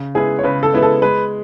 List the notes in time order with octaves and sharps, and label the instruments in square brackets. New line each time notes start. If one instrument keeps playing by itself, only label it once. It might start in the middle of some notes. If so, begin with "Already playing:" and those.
Already playing: [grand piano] C#3
[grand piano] G#3 B3 E4 B4 [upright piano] G#4
[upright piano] C#5
[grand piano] C#3 [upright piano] B4
[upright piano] A4
[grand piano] G#3 B3 E4 B4
[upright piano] A4
[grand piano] G#3 [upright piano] B4